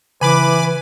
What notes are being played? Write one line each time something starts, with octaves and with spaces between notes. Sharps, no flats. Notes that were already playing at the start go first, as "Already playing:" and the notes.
C#3 E3 B4 G#5 B5 D6